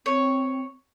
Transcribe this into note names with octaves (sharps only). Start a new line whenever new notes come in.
C4 C#5